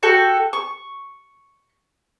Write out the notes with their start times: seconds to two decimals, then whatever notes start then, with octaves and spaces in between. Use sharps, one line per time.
0.03 F#4 A4 G5
0.53 C#6